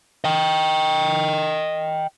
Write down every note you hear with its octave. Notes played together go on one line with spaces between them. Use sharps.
D#5 G5